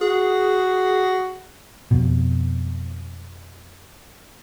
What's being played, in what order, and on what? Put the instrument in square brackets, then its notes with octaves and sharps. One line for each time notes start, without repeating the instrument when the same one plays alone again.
[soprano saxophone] F#4 [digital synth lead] G#4
[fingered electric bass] F2 B2